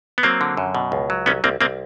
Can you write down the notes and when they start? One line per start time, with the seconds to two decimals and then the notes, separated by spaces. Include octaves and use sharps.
0.18 B3
0.23 F#3 A#3 C4
0.41 D3
0.57 F#2
0.75 B2
0.92 C#2
1.10 F#3
1.26 C2 B3 C#4
1.44 C2 A#3 C4
1.61 C2 A#3 C4